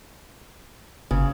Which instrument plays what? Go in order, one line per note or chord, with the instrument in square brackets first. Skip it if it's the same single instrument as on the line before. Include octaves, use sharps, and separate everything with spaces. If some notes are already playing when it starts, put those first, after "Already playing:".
[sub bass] G1 [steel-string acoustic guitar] C#3